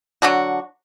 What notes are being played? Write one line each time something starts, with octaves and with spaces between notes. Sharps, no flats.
D3 F#3 D4 F#4